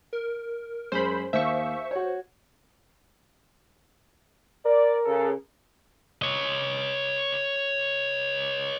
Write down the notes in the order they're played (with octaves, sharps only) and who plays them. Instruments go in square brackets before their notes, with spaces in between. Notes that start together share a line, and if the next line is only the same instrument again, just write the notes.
[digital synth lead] A#4
[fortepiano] F#2 G#3 [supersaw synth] C5 B5
[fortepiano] D#2 [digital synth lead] C5 [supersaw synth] E5 C#6
[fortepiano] F#4 C#5
[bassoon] A#4 [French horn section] D5
[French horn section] C#3 A4
[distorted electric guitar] C#5 D#5